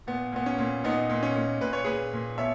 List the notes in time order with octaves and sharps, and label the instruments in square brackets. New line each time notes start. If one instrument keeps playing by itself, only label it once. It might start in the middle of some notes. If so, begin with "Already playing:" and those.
[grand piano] A#2 B3
A#2 B3
C#4
A#2
A#2 B3 D#4
A#2
C#4
A#2
A#2 B4
C#5
A#2 G#4 B4
A#2
B2 C#5 E5